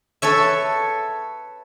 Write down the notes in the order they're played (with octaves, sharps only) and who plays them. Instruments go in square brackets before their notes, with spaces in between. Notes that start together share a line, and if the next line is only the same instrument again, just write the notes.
[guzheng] A4 B4 C#5 E5